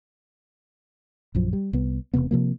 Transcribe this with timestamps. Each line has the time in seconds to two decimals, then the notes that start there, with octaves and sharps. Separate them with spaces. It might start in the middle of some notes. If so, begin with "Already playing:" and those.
1.35 A#1 F#2 F3
1.53 G3
1.73 C2 B3
2.14 E1 D#2 C3 B3
2.31 C3 F3 A#3